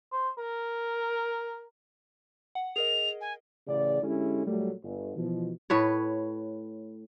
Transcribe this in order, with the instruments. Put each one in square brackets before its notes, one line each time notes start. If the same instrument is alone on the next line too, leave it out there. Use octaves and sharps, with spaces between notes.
[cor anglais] C5
A#4
[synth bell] F#5
[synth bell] G#4 A#4 D#5 [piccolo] F7
[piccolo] G#5
[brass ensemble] A1 C#3 D5
D3 G#3 C#4 E4 G4 A4
A#2 F#3 G3 A3
G1
B2 E3 F3
[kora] A2 B4 C#5